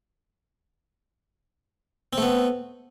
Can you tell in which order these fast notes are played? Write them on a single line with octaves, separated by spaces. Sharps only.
C4 A3 B3